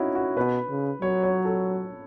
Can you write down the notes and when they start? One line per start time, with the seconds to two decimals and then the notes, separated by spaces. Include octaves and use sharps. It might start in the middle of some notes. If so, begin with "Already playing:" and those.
Already playing: C#4 D#4 E4 F#4
0.15 F#4
0.37 B2 B4
0.69 C#3
1.01 F#3 C#5
1.23 C#5
1.45 A4